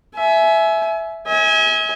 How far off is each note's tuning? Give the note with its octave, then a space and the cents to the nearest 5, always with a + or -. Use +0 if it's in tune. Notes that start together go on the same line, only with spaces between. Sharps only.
E5 +0 G#5 +30
E5 -45 G#5 +0